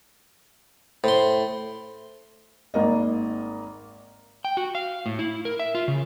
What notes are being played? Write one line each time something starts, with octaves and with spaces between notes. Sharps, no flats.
A2 C5 C6
G#1 A#3 D#5
G5
F#4
F5
A2
E4
A#4
E5
F4
C#3